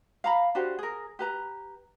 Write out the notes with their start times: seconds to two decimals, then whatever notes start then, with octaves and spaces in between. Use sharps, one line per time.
0.24 F5 A#5 B5
0.55 D4 F#4 G4 C5
0.79 G#4 A#4
1.19 G4 B4 A#5